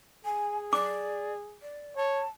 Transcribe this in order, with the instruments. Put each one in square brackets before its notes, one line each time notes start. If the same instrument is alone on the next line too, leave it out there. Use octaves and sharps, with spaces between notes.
[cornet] G#4 [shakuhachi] G#5
[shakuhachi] D5 [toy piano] D6
[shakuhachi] D5
[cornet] C#5 [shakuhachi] A5